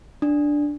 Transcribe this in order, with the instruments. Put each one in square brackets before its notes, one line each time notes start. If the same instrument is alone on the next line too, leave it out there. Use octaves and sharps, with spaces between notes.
[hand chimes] D4